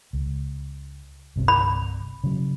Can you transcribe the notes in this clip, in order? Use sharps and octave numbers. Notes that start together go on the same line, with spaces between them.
C#2
G1 C2 C3
B5
C#3 F#3